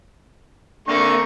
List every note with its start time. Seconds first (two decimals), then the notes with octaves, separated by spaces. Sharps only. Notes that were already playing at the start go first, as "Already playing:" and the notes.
0.88 D3 A3 A#3 C4 C#6